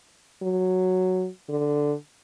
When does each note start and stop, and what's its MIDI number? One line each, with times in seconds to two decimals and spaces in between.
0.43 1.27 54
1.49 1.94 50